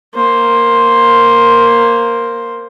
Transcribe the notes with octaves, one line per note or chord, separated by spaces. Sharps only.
A#3 C5